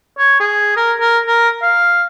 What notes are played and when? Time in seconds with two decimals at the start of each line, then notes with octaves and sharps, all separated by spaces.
0.18 C#5
0.40 G#4
0.76 A#4
1.00 A#4
1.27 A#4
1.62 F5